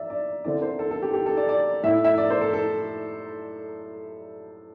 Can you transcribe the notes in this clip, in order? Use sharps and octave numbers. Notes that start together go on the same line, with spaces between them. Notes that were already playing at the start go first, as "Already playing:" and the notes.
Already playing: D5 E5
D5
D3 C4 E4 D5
C5
A4
A4
G4
G4
A4
D5
D5
A2 A3 E4 E5
E5
D5
C5
A4
A4